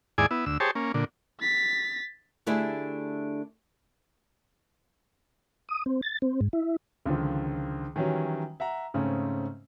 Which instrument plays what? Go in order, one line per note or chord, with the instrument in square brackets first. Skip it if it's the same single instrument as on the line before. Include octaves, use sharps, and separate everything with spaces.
[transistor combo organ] D#2 G#2 E4 G#4 D5 G#5
B3 E4
D2 E6
G4 G#4 C5 C#5 A5
A#3 C#4
A#2 D3
[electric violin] A6 B6
[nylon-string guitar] D3 A3 D4 E4 G4 G#4
[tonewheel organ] D#6
C4
A6
C4
G#2
E4
[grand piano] C#2 D3 D#3 F3
D#3 E3 F#3 G3 C#4
E5 F#5 A#5
G#2 C#3 A3 C4 C#4